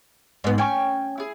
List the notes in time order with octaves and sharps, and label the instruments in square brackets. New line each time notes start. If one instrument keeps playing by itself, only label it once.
[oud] G#2 B3
[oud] C#4 [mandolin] G5 G#5 C#6
[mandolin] E4 G#4